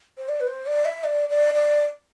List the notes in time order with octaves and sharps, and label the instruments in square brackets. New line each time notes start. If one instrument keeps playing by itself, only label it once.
[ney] C5
D5
B4
C5
D5
E5
D5
D5
D5